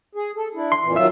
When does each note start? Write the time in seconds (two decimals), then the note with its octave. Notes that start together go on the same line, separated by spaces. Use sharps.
0.15 G#4
0.37 A4
0.55 D4 E4
0.72 C6
0.83 F2 A#2 E3
0.96 D#3 F#3 F4 E5 E6